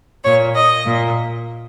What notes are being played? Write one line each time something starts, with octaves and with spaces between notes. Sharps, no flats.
A#2 C#5
D#5
A#2